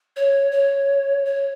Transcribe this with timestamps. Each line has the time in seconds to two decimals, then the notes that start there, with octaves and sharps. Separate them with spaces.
0.16 C#5
0.52 C#5
1.25 C#5